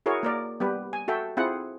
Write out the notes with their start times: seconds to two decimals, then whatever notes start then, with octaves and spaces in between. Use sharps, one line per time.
0.06 E4 F#4 G#4 A#4 C#5
0.23 A#3 A#4 D5
0.60 G3 B3 G4 B4
0.93 G#5
1.08 F#4 A4 E5 G5
1.37 C4 E4 F4 G#4 F#5